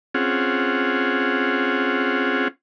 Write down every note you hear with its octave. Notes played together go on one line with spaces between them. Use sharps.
C4 C#4 F4 G#4 F#5